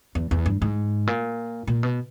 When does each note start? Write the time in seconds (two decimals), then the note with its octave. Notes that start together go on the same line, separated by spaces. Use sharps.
0.15 E2
0.31 E2
0.46 G2
0.62 G#2
1.07 A#2
1.67 A#2
1.83 B2